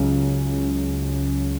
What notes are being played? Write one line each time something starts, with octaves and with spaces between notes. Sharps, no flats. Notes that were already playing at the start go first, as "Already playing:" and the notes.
Already playing: C#2 C#3 F#3 C#4